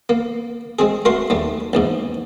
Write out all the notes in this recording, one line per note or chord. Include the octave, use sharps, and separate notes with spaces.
A#3
G#3 C4 G#4
A3 F#4 A#4 C6
D#2 G3 A3
A#1 E2 G#2